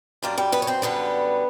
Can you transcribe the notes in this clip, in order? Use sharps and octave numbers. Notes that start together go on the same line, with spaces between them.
F#2 D3 G3 A#3 A#4
G3 G4
B3 B4
C#5
C4 C5
F#2 D3 G3 B3 B4